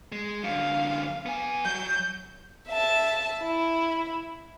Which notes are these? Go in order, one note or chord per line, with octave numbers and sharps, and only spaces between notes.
G#3
F#2 D3 F5
B3 G#5
F#3 G6
E5 A5
E4